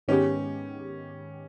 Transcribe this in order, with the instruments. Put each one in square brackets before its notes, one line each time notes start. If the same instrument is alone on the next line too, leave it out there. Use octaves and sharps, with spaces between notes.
[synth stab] G#2 D#3 G#3 B3 G4 [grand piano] C#4